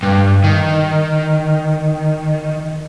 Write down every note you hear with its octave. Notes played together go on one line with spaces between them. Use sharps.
G2
D#3